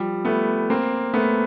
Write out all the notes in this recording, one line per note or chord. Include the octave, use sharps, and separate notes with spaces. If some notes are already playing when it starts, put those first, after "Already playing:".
Already playing: F3 G3
A3 B3
A#3 C4
A3 B3